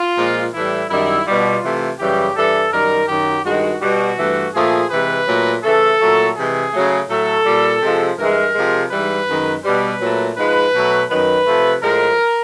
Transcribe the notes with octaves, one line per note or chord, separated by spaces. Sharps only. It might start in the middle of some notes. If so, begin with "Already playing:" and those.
Already playing: F4
A#2 F3 G#3
A2 E3 G3 E4
F#2 D#3 G3 E4
B2 G3 F4
C3 E3 A3
F#2 C#3 E3 G3 G4
G2 E3 G3 A4
F#2 D#3 G3 A#4
F#2 D#3 F#3 G4
G2 D#3 G#3 F#4
B2 G3 F#4
G2 E3 A3
A#2 F3 A3 G#4
C3 E3 G#3 B4
A#2 F#3 A3
C#3 E3 A3 A4
A#2 F#3 A3
C3 E3 G#3 G#4
C#3 F#3 A3
A2 F#3 A3 A4
A#2 G3
C3 F3 G#3
G2 E3 G#3 A#4
C3 F3 G#3
G#2 E3 G3 B4
F#2 D#3 G#3
B2 G3 B4
A#2 F#3 A3
G#2 F3 G#3 B4
B2 F#3 A3
F#2 D#3 F#3 B4
C3 F3 A3
A2 F3 G#3 A#4